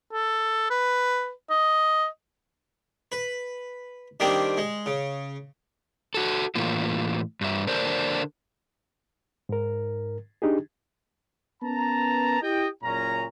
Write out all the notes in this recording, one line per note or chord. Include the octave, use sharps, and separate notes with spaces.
A4
B4
D#5
B4
D#3 G3 A#3 C4 D4
G#3
C#3
F#4 A4
A2 E3 A#3 F4
G2 E5
D3 D4 A#4 C5
G#2 A#4
D4 D#4 G4 G#4
B3 C#4 A#4 B4 A5 A#5
E4 G4 D#5 G5
F#1 A#2 C#4 A#5